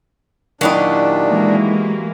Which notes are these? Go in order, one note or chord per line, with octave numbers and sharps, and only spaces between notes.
A#2 D#3 F#3 D4 E4 G4 D#5
E3 G#3 A#3